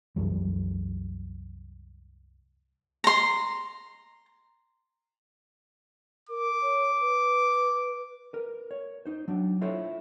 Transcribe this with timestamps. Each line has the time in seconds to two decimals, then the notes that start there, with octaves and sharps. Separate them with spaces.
0.16 C2 F#2 E3 G3
3.04 A#5 C6
6.29 A#4 D6
6.62 C#5
7.01 B4
8.33 A#4 B4
8.71 C#5
9.06 D#4 C5
9.28 F#3 D4
9.61 E4 F4 A4 C5 C#5